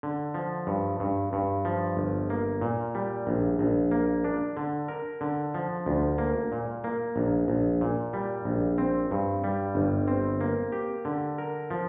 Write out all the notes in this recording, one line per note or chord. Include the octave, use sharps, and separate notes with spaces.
D3
F3
G2
G2
G2
F3
G1
A#3
A#2
G3
A#1
A#1
A#3
D4
D3
A#4
D3
F3
D2
A#3
A#2
A#3
A#1
A#1
A#2
G3
A#1
C4
G2
G3
G1
C4
A#3
G4
D3
A#4
F3